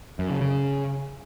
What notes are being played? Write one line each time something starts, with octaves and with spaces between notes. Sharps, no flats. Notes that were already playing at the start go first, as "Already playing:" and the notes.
F#2
C#3
C#3